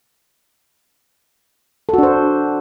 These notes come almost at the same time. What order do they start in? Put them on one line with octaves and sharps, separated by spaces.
A4 F#4 D4 C5